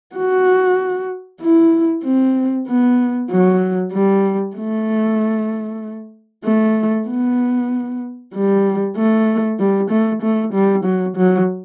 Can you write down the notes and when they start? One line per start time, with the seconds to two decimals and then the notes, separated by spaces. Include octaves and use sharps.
0.16 F#4
1.41 E4
2.04 C4
2.68 B3
3.31 F#3
3.93 G3
4.57 A3
6.44 A3
7.08 B3
8.34 G3
8.96 A3
9.59 G3
9.90 A3
10.22 A3
10.53 G3
10.84 F#3
11.17 F#3